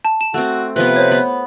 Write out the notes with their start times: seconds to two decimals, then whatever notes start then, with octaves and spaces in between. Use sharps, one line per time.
0.05 A5
0.21 E7
0.34 A3 C4 F#4
0.76 C3 F3 B3 B4
0.96 C5 C#5
1.11 B3